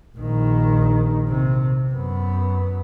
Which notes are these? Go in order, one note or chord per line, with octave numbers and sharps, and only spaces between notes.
A#1 D#3
C3
F#2 B3